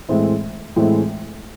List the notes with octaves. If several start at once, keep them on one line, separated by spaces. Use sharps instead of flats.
A2 E3 G#3 C4 E4
A2 E3 G#3 C4 E4